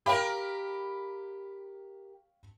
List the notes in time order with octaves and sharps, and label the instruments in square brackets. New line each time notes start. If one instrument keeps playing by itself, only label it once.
[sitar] G4 A#4 [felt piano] C#5 F5 G5 [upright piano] B5